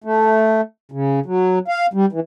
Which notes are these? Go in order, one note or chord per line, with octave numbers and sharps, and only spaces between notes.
A3
C#3
F#3
F5
G3
E3